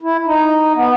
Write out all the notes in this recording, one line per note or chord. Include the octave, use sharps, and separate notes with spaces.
E4
D#4
B3